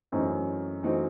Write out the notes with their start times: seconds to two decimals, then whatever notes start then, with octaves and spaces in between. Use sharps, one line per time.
0.12 F#2 E3 A3 C4 D#4 F#4
0.83 E3 A3 C4 D#4 F#4